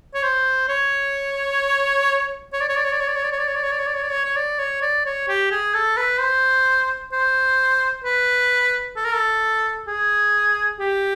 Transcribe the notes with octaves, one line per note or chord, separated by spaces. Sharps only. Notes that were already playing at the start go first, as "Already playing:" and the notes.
C#5
C5
C#5
C#5
D5
C#5
D5
C#5
D5
C#5
D5
C#5
D5
C#5
D5
C#5
D5
C#5
D5
C#5
D5
C#5
D5
C#5
C#5
D5
C#5
D5
C#5
G4
G#4
A4
B4
C5
C5
B4
A4
A#4
A4
G#4
G4